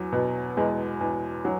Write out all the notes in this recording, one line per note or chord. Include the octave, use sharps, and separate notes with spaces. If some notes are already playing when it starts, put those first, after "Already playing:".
Already playing: E2 F#3
B2
E2 G#3
E2
F#3